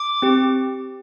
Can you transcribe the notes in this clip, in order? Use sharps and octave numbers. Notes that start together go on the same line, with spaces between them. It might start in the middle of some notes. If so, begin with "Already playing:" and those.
Already playing: D6
C4 G4